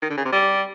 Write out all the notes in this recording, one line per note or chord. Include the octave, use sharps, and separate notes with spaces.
D#3
D3
C#3
C3
G3